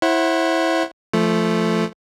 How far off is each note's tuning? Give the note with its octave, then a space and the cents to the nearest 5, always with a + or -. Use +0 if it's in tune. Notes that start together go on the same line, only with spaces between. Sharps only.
E4 +0 C5 +35 F#5 +0
F3 -15 A3 +0